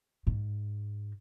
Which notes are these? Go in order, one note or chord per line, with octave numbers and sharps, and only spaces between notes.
G#2